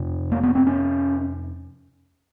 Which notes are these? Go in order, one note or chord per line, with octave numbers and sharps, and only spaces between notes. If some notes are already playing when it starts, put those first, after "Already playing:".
Already playing: F2 C3
A#3
B3
C4
C#4